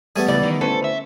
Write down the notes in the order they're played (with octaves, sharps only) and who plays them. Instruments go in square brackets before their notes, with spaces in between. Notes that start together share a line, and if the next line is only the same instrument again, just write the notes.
[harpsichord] G3 A3 B3 [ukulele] G#4
[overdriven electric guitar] C#2 [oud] E3 [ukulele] D5
[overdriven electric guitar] D#3
[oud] D2 B4 C5 [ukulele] C#4 [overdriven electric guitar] A4
[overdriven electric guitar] E5